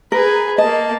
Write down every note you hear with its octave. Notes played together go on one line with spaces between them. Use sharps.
G#4 A#4 B4
A#3 D#5 A5